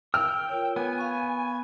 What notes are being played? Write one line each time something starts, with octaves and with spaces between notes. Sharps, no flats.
G5 E6 F6
F4 A#4 C#5
B3 G#5
F5 B5 C#6